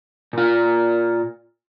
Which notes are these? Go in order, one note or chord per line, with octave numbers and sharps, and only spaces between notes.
A#2 F4